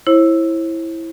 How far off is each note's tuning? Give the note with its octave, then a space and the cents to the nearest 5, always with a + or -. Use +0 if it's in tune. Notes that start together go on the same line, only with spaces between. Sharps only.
E4 +0 C5 +45